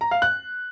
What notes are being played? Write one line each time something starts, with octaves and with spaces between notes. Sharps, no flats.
A#5
F5
F#6